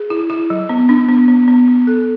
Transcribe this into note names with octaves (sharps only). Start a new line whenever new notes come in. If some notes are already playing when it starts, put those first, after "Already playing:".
Already playing: G#4
E4
E4
F#3
B3
D4
B3
B3
B3
B3
A4